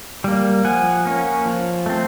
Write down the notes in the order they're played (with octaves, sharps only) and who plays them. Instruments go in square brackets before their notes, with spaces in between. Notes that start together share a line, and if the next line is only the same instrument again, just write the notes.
[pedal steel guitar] G3 A#3
F3 F#5 G#5
A#3 C#4
F3
A3 C4